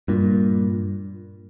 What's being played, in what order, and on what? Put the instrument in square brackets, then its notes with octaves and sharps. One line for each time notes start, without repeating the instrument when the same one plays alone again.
[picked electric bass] G2 A#2